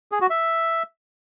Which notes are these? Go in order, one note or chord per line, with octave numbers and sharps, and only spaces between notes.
G#4
F#4
E5